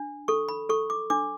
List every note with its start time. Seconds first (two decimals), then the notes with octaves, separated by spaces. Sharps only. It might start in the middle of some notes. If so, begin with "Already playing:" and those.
Already playing: D4
0.28 A4 C#6
0.49 B5
0.69 A4 C#6
0.90 D6
1.10 D4 D6